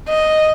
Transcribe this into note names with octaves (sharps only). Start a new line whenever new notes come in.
D#5